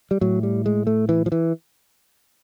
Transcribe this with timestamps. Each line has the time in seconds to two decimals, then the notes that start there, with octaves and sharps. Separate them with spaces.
0.11 G3
0.21 A2 F#3
0.43 G3
0.66 G#3
0.87 A3
1.09 E3
1.26 F3
1.32 E3